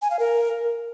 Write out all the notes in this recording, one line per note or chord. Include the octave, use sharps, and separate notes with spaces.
G#5
F5
A#4